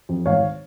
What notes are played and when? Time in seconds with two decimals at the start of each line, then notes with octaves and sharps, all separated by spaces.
0.09 F2
0.26 G#1 C#5 F5